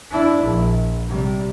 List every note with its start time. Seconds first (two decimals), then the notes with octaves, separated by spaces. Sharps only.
0.11 D4 E4
0.43 A#1
1.08 C3 G3